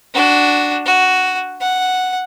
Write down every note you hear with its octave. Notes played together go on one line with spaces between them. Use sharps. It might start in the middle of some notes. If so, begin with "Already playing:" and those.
D4 F#4
F#4
F#5